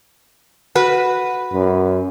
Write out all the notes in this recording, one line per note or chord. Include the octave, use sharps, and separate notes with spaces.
F#4 B4
F#2